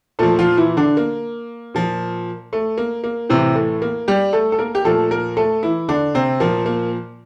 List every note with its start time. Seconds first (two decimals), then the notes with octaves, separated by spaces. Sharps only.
0.19 A#2 F3 A3 A4
0.39 F3 F4
0.57 E3 E4
0.77 D3 D4
0.97 A#3
1.74 A#2 F3
2.53 A3
2.78 A#3
3.04 A#3
3.29 A2 C3 E3 C4
3.55 A3
3.82 A#3
4.08 G3 G4
4.33 A3 A4
4.52 A4
4.59 A#3 A#4
4.75 G4
4.85 A#2 F3 A3 A4
5.11 A#3 A#4
5.37 A3 A4
5.63 E3 E4
5.88 D3 D4
6.14 C3 C4
6.40 A#2 F3 A#3
6.66 A#3